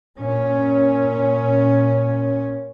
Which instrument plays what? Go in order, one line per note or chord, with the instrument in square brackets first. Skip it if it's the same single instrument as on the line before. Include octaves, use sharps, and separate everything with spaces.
[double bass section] A#2 C#4